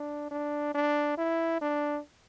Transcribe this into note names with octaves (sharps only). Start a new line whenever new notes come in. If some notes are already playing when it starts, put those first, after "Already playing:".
Already playing: D4
D4
D4
E4
D4